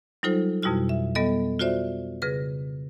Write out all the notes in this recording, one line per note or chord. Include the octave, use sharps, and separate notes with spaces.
F#3 G3 D#4 F4 A4 C5
F2 B2 G3 E4 F#4 F6
E5
G3 B3 A4 D#5
F4 F#4 C5 D5 E5
C#3 G#4 B4 A#6